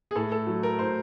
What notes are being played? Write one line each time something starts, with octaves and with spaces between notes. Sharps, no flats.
G#4
A2 A4
A4
F#3
A#4
A2 C5